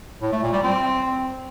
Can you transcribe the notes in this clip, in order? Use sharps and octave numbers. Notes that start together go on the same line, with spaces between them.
A2
A3
A#2
G3
C4